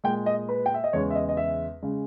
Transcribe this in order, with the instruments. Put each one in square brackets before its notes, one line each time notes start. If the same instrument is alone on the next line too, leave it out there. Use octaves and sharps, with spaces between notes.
[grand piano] A#2 G#3 G5
D#5
B4
G5
E5
D#5
E2 C#3 G#3 C#5
E5
D#5
D#5
E5
C#3 G#3